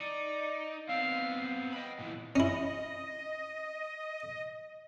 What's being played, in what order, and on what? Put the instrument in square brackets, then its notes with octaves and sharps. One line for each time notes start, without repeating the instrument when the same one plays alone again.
[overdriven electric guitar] D#4 [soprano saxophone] D5
[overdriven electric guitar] B3 C4 [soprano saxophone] F5
[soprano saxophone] D#5 [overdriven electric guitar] G5 B5
[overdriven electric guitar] A#2 E3
[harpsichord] C#4 E4 [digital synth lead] D#5